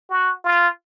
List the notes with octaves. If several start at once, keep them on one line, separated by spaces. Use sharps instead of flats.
F#4
F4